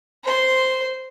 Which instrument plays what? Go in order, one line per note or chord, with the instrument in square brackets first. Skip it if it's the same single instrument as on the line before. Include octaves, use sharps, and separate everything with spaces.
[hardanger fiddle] C5 C6